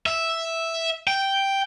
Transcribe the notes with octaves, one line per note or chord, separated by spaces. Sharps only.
E5
G5